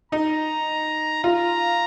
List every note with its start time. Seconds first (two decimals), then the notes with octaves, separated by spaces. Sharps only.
0.12 D#4 A#5
1.23 F4 A#5